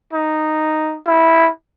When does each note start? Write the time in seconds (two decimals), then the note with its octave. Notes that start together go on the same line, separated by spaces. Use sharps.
0.13 D#4
1.06 E4